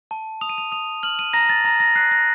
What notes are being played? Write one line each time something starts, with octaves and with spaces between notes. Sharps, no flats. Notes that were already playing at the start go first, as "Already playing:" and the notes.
A5
D#6 F7
D#7
F7
D#6 F7
F6 F#7
D#7
A#5 A#6
A6
A#5 A#6
A#6
F#6 C7
A#6